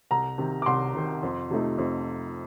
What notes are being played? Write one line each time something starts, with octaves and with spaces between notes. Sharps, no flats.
C2 A#5
C3 D#3
D6
C2 C6
C3 D#3
F2
C3 F3 A3 D#4
F2